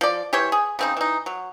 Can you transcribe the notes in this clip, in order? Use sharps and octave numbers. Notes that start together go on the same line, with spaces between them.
F3 D5
E3 G4 C5 C#5
G#4
C#3 C4 D#4
E3 D#4
F#3